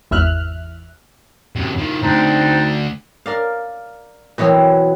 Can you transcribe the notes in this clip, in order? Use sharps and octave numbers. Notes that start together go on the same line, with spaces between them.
G#1 E2 E5 F6 F#6
F#2 C3
D#3 F3
D2 C4 D4 D#4
A#4 D5 F5
B2 E3 F#3 B3 C4